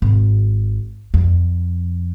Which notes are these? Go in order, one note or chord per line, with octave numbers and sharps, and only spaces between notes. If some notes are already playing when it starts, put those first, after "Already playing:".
G#1
F2